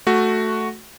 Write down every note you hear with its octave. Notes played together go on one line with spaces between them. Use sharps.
A3 F#4